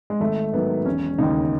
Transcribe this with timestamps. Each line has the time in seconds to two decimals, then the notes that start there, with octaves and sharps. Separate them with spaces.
0.10 G#3
0.20 G#1 A3
0.53 G#2 D#3 F#3 B3
0.85 E1 C#4
1.19 D#2 C#3 D#4